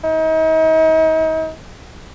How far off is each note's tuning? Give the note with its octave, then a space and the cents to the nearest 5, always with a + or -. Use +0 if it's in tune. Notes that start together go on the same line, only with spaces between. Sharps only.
D#4 +40